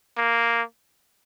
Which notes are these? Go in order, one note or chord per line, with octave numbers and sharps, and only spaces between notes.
A#3